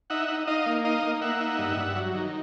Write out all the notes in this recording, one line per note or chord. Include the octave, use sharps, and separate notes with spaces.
D#4 E5 F#5
D#4
D#4 D#5 F5
A#3
D#4 D#5 F5
A#3
A#3 E5 F#5
D#4
G2
G2
F#3
D#3